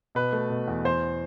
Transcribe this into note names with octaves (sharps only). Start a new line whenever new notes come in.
B2 B4
A3
B2
E2
E2 C5